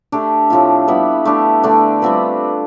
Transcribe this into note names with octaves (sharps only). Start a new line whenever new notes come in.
A3 D4 G4
A2 F3 C4 F4
G3 B3 E4 B4
A3 D4 G4
D3 A3 D4
G3 C4 F4 B4